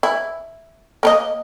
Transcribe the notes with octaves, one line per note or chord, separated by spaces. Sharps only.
E4
A#3 A#4 D#5